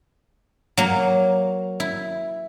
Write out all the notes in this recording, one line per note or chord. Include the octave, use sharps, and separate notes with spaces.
F#3 A#3
E4